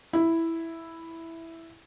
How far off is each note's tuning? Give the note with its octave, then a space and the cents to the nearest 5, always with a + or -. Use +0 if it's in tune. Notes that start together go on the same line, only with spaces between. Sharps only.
E4 +0